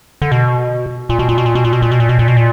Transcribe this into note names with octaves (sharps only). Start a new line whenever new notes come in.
D3
B2
A#2
B2
A#2
B2
A#2
B2
A#2
B2
A#2
B2
A#2
B2
A#2
B2
A#2